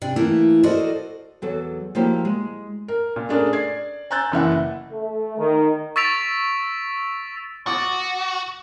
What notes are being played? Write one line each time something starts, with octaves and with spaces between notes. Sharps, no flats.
C3 D4
E3 A3 A#3 E4
F#4 A4 A#4 C5 D5 D#5
E2 F#3 A4
F3 F#3 A#3 E4 G4
G#3
A#4
A#2
A3 C#4 D4 G#4 A#4
D5 G#6 C7
G#5 A#5 E6 F#6 G6 A6
F#1 E3 E5 F#5
A3
D#3
C#6 E6 A6 B6 D7 F7
F#4 D6 D#6 A6